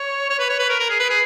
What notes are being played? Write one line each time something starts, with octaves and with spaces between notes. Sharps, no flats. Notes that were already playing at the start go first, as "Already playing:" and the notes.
Already playing: C#5
C#5
B4
C#5
B4
A#4
A#4
G#4
B4
G#4